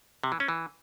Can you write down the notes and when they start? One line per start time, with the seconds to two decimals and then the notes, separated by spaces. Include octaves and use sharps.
0.24 C3
0.32 E3
0.40 C#4
0.48 E3